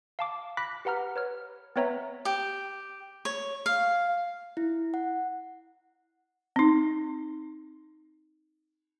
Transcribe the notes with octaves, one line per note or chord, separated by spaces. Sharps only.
F5 A5 D6
B5 D6 F#6 A#6 B6
G4 B4 F#5 A#5 F6
B4 C#5 F6
B3 C4 B4 C#5 E5 A#5
G4
C#5
F5
E4
F#5
C4 D#4